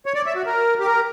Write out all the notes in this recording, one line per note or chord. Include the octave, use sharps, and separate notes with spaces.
C#5
D5
E5
F#4
A#4
G4
A#4